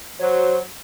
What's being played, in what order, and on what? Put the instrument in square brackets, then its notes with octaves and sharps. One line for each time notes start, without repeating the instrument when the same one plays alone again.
[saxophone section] F#3 [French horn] C5